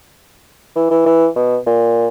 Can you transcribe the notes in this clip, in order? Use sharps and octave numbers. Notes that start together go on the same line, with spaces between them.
E3
E3
E3
B2
A#2